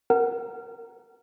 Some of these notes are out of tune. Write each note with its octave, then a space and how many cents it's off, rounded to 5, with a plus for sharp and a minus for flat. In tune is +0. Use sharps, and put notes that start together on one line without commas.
A#4 +0 F#5 +10